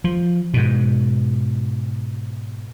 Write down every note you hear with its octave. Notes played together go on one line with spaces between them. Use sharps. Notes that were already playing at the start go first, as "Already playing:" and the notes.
F3
G#2 B2